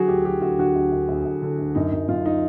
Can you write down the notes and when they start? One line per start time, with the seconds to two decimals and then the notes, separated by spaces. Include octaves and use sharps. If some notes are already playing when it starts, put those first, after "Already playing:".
Already playing: D3 F#3 F#4 G#4
0.08 D2 G4
0.25 F#3 G4
0.41 D2 F#4
0.58 D3 F#4
0.76 D2
0.92 D2
1.08 D2
1.25 D2
1.42 D3
1.59 D2
1.75 F#2 D#4
1.93 F#2
2.08 F#2 F4
2.26 D#4